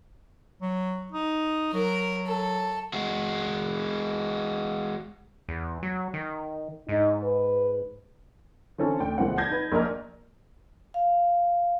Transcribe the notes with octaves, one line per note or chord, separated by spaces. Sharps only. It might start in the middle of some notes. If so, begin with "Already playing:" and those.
F#3
D#4
F#3 A#4
A4
G#3 F#4
E2
F#3
D#3
G#2 D#4
B4
D3 E3 C4 C#4 A4 C#5
D2 G5
C#2 A#2 E3 C4 F#5
A5 G6 G#6 A#6
D#4 B4
A#1 A#2 A#4 D#5 A#5 F6
F5